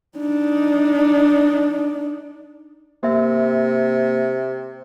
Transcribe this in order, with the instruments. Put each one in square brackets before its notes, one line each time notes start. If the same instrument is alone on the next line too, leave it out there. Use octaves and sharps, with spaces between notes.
[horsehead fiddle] D4 D#4
[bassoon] C3 [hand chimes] A#3 E5